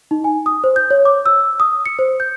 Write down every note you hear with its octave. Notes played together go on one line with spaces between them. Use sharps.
D#4
G#5
D#6
C5
G6
C#5
D6
E6
D#6
C#7
C5
G6